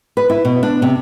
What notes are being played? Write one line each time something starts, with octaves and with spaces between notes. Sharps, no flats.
B4
E4
B2
D4
C3